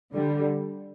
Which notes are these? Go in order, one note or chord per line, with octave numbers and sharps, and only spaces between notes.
D3 G3